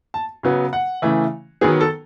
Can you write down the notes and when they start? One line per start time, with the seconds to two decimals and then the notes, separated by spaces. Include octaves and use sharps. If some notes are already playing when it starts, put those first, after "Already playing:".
0.14 A5
0.43 C#3 F#3 B3
0.73 F#5
1.02 C#3 E3 A3
1.61 D#3 F#3 B3 G#4
1.81 A4